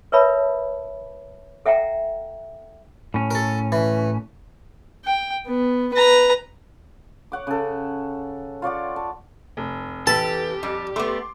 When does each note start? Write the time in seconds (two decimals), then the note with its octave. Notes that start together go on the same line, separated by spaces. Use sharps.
0.12 A#4 B4 C#5 E5 A5 B5
1.66 A4 E5 F#5 G5 A#5
3.14 A2 C#4
3.31 A4 A#4
3.72 E3
5.05 G5
5.47 B3
5.94 B4 A#5
7.32 C#5 F#5 D6
7.47 C#3 A4
8.62 F4 C#5 D5 F#5
8.96 A5
9.57 F1
10.07 E3 G4 A4 B4 A5
10.63 F2 G3
10.96 A3 B3 C6 D6